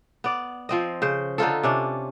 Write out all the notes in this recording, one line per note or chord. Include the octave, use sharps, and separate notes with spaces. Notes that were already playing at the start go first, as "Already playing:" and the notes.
B3 D5
F3 C4 D#5
C#3 C5
D3 D#4 F4 A4
C3 C#4 D4